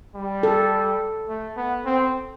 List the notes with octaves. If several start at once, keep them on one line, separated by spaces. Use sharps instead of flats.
G3
A4
A3
B3
C4